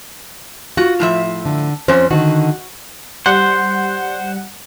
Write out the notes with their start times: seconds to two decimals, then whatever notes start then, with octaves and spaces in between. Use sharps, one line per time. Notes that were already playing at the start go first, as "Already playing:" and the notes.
0.77 F4 F#4
1.00 A2 F3 E5
1.45 D3
1.88 F2 C#4 C5
2.11 D3 D#3 F#4
3.26 G3 C5 F#5